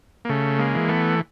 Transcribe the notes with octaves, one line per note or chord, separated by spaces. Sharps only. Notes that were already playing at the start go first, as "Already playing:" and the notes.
A#3
C#3 A3
G#3 A#3
E3
A3 B3